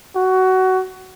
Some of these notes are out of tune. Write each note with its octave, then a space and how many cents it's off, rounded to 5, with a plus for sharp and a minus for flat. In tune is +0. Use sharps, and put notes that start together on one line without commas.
F#4 +20